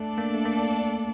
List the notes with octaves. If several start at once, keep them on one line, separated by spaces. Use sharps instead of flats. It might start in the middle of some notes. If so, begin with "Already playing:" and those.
Already playing: A3 D4 A4 D5
A#3
A3
A#3